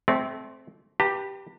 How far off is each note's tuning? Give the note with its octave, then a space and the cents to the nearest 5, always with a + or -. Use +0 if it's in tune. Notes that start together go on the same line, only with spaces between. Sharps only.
A3 -25 C4 +0 D5 -40
G4 +0 B4 -10 A5 +45